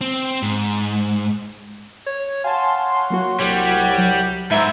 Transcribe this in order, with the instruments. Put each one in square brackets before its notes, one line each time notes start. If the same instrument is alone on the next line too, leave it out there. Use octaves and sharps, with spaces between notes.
[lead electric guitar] C4
G#2
[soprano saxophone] C#5
[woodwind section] C#5 F#5 C6 [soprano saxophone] F5 [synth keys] G#5 A5
[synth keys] F#3 A#3 F#4
[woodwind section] C2 F#5 [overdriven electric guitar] G3 [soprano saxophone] C#5
[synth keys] F#3
[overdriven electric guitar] G#2 [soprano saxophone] E5 [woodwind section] A#5 B5 E6